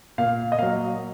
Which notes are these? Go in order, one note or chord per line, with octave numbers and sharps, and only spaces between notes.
A#2 F5
D#5
F#3 A#3 F5